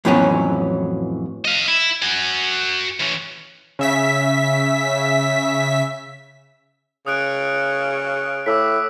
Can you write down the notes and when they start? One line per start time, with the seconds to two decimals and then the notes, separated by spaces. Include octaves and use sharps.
0.05 F2 A2 E3 F#3 B3 C#4
1.45 D#5 F5
1.68 E4
2.02 F#4 G#5
3.00 E3 C#4
3.79 C#3 E5 B6
7.07 C#3 D#6 F#6 D7
8.46 A2 D6 E6 B6